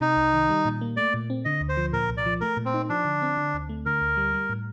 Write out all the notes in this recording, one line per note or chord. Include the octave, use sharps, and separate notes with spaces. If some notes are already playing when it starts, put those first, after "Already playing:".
C3 D#4
C2
D#3
G3
A#2
A#3
A3 D5
A#2
C4
D3 D#5
D2
C5
F3
A#2 A#4
C2
D5
F3
A3 A#4
A#2
C4
D#4
F3 D4
D3
C4
D3
D2
A3
D3 A#4
D2
G3
G3
A2